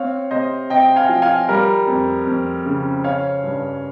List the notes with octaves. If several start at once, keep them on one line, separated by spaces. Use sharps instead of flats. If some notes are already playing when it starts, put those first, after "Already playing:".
Already playing: C4 C#5 F5
C3 C5 D#5
C3 D#5 G5
F5 G#5
F3
F5 G#5
G3 A#4
F2
F2
C#3
C#4 C#5 F5
G2